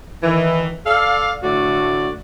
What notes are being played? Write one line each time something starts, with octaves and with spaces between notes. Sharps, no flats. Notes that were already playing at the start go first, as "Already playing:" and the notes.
D#3 E3
A4 D5 F5
A2 D3 A3 F#4 D5